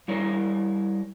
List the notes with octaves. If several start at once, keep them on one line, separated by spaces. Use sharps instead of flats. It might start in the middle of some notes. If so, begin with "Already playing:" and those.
G3 E4 A#4 C#5